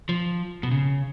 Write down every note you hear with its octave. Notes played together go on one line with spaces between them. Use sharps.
F3
B2
C#3